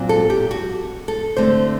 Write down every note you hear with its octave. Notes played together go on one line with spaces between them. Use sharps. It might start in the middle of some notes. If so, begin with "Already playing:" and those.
Already playing: A#2 F#3 C4
A4
G4
F#4
A4
D3 A3 C4 C5